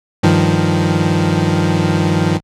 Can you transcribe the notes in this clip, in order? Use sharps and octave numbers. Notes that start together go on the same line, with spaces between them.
G2 D#3 F3